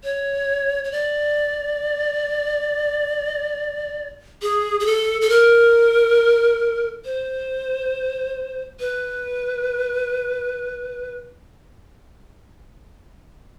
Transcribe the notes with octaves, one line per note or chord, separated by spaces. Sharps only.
C#5
C#5
D5
G#4
G#4
A4
A4
A#4
C5
B4